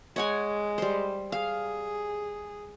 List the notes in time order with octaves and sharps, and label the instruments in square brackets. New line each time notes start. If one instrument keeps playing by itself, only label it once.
[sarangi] G#3 [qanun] C#5 F#5 G#5
[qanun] G3 C5
[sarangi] G#4 [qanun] F5